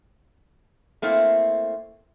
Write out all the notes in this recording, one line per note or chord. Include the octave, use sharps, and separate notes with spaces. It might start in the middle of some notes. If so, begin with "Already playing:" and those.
A3 A#3 C4 E4